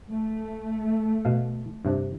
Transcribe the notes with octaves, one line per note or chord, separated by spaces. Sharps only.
A3
B2 F5
G2 C3 D4